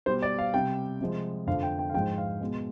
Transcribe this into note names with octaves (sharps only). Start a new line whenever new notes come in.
B2 G3 C5
D5
F5
C3 G3 G5
C3 F3 G#3
F2 D3 F3 F5
G5
G5
F5
G#2 F3 G#3 G5
F5
B2 G#3